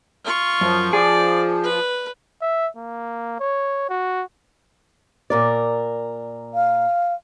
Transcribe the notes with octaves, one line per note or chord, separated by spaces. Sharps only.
F4 C#6
F#2 F3
F4 G#4 D5
B4
E5
A#3
C#5
F#4
A#2 A#4 D5
F5